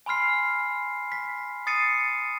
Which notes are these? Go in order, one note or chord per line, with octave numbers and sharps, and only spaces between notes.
G#5 B5 C6 F6 C7
B6
D#6 A6 C7 C#7 D#7